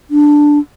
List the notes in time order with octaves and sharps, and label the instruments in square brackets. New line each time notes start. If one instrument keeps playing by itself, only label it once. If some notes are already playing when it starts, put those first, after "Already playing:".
[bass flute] D4